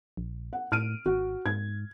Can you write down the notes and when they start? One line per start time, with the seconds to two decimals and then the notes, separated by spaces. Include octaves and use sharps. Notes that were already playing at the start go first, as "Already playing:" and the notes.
0.17 A#1
0.53 F#5
0.72 A2 F6 D7 D#7
1.06 G#1 F#4
1.46 G#2 G#6